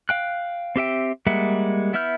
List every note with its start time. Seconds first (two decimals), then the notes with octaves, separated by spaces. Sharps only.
0.09 F5 G5 F#6
0.76 C4 G4 E5 G5
1.27 G3 G#3 A#3 E5 F#5
1.93 B3 E4 E5 F6 G6